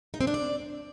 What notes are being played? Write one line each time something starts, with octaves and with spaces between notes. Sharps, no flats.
D#4
C4
D4
D5